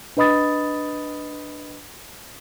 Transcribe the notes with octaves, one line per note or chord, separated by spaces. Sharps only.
D4 B4 D#5 B5 D#6 A6